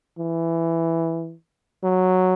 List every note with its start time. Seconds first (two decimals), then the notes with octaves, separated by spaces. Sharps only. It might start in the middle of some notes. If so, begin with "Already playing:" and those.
0.19 E3
1.84 F#3